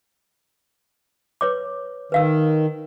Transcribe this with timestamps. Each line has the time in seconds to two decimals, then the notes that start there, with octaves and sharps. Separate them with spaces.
1.41 B4 C#5 D6
2.12 D#3 B4 F5 E6